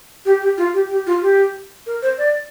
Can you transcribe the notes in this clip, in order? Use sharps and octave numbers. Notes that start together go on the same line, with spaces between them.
G4
G4
F4
G4
G4
F4
G4
A#4
C5
D5